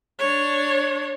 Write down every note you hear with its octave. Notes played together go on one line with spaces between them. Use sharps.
D4 C#5